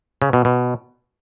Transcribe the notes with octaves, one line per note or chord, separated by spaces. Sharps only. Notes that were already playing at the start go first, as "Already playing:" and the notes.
C#3
B2
B2